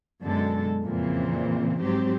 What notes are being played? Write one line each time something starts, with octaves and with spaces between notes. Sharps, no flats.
F#2 B2 D3 G#3 A4
F2 A#2 C#3 E3 C4
G#2 F#3 C4 G4